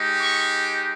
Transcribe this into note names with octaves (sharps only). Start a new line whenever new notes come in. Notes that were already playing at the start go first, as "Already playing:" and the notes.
Already playing: G#3 D#4 G4
C#6